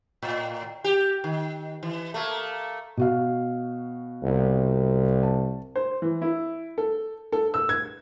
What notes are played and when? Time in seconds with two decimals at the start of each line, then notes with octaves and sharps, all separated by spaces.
0.22 A2
0.84 G4
1.24 D#3
1.83 E3
2.14 A3 A#3
2.97 B2 F#4 F5
4.23 C2
5.23 A5
5.76 C5
6.02 E3
6.22 E4
6.78 A4
7.32 A4
7.54 E6
7.69 G#6